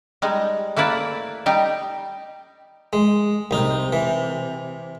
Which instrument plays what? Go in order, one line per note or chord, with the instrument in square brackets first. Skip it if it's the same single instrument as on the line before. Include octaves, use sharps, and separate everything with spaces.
[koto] G3 G#3 D#4
A3 A#3 E4 B4 D5
G3 D#4 G4
[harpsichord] G#3
[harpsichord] C2 D#4 [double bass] C3
[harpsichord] E3